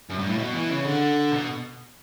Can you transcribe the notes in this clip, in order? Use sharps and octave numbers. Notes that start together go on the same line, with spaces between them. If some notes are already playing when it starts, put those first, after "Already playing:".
F#2
G2
A2
B2
E3
C#3
D3
B2